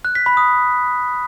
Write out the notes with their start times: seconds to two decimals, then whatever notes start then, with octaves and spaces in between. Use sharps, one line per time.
0.05 F#6
0.15 B6
0.26 B5
0.37 D#6